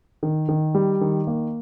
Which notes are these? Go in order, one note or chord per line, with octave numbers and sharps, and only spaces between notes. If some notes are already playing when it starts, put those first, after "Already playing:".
D#3
D#3
G3
D#3
A#3